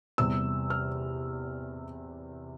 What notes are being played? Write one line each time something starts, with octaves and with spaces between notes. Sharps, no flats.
E2 C3 G3 E6
F6